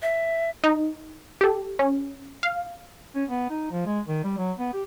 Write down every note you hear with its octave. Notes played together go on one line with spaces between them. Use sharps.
E5
D#4
G4 A4
C#4
F5
C#4
B3
D#4
F3
G#3
D#3
G3
F#3
B3
G4